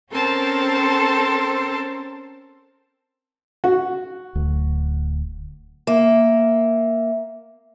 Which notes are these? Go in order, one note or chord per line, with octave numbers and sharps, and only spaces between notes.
C4 C#4 A4 A#4 C5 A5
F#4
D1 D2
A#3 E5